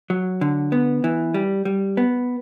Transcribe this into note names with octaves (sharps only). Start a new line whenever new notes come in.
F#3
D3
B3
E3
G3
G3
B3